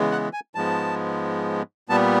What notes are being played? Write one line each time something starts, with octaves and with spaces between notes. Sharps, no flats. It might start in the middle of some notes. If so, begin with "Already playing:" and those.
Already playing: C#3 E3 G#3 B3
F#5
G#5
G#2 F3 G#3 B3 A5
A#2 G3 B3 A5